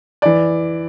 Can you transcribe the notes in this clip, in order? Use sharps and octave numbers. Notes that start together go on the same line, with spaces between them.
E3 D5